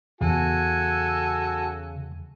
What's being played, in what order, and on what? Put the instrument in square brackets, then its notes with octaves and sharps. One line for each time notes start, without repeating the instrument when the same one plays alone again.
[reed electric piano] E2 [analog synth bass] C#3 [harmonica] F#4 A4 G#5